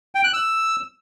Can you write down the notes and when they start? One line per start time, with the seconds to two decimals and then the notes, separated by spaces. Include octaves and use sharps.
0.15 G5
0.24 F#6
0.33 E6